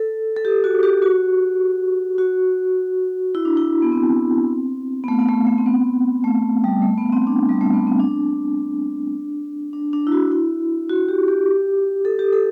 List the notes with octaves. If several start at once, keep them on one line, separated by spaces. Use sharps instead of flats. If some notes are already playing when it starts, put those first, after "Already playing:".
Already playing: A4
A4
G4
F#4
G4
F#4
F#4
E4
D4
E4
B3
C4
B3
A3
B3
A3
A3
C4
B3
A3
G3
A3
B3
C4
D4
G3
A3
B3
C4
D4
D4
D4
E4
F#4
E4
F#4
G4
G4
A4
G4
A4